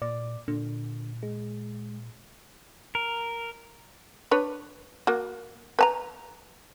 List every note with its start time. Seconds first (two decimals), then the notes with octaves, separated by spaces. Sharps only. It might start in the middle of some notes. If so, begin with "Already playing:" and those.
0.02 A#2 D5
0.48 A#2 D3
1.23 G#3
2.95 A#4
4.31 D4 B4 C#5
5.07 A#3 F#4
5.79 B4 A5 A#5